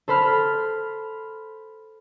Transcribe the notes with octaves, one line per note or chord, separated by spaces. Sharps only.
A4 C5 B5 F6